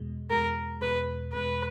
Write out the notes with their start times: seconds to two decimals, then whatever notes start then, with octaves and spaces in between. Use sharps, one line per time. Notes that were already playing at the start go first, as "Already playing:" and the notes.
Already playing: E2 B2 G#3
0.30 E2 B2 G#3 A#4
0.81 E2 B2 G#3 B4
1.33 E2 B2 G#3 B4